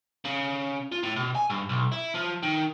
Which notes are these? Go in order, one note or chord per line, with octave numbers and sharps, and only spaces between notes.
C#3
F4
A2
B2
G#5
G2
B1
E4
F3
D#3